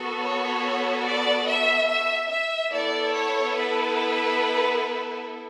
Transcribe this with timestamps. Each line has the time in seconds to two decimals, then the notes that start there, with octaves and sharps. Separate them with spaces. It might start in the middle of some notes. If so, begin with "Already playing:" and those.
Already playing: B3 F#4 A4
0.20 C#5
1.04 D5
1.46 E5
1.88 E5
2.29 E5
2.72 B3 E4 A4 D5
3.14 C#5
3.55 B4